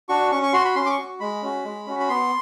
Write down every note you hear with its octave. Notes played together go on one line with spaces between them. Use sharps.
D4 F#4 C#6
C#4 C#6
C#6
F#4 C6
B5
C#4 C6
D6
C#6
F#4
G#3 B5
C#4 F#4
G#3
C#4 F#4
B5
B3 C6